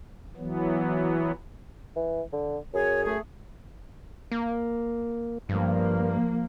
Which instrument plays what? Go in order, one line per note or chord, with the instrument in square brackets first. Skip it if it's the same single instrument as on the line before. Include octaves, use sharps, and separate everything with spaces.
[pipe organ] E3 F#3 B3
[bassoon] E3
D3
[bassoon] F#2 [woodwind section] G#4 C#5
[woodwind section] A3 G#4
[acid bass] A#3
[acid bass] G2 [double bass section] F3 A#3